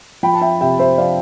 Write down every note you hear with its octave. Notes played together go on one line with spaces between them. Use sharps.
F3 G5 B5
A5
E5 G5
C3 E5 G5
C5 E5
F3 D5 F5